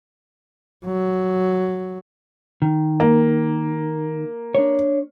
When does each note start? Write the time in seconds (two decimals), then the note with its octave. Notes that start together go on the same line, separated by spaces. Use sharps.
0.85 F#3
2.62 D#3
3.00 A#3
4.55 D4 C#5